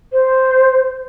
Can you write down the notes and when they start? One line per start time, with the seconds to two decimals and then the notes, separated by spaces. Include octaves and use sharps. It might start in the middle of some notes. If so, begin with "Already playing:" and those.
0.13 C5